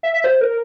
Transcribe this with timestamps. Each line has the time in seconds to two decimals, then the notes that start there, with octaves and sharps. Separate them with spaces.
0.03 E5
0.13 E5
0.24 C5
0.41 A#4